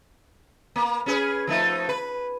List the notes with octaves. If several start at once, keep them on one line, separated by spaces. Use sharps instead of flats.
A#3
C#4 G#4 B4
F3 A3 D#4
B4